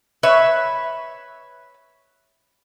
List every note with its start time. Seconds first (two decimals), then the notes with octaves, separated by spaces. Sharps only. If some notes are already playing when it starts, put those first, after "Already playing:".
0.23 B4 C#5 E5